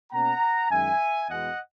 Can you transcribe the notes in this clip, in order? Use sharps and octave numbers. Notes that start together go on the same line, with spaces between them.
B2 A#3 C#4 F#5 A#5
F#2 D#3 G#3 E5 G#5
E2 B2 G#3 D#5 F#5